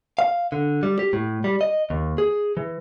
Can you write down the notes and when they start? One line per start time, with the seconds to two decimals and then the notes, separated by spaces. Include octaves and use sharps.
0.19 F5
0.52 D3
0.83 G3
0.99 G4
1.13 A2
1.44 G3
1.61 D#5
1.90 D#2
2.18 G#4
2.57 E3